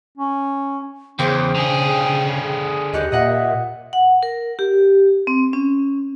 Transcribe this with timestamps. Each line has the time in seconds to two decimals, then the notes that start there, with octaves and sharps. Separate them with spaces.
0.17 C#4
1.19 E2 C#3 C5 G5 C6 C7
1.55 D3 G#4
2.93 D#2 G4 D#5 F#6 C#7
3.12 A#2 D#5 E5 F#5
3.93 F#5
4.23 A#4
4.59 G4
5.27 C4
5.53 C#4